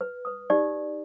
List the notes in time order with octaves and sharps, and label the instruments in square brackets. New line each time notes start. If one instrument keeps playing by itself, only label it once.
[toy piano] B4
B4 D#6
D#4 G4 D5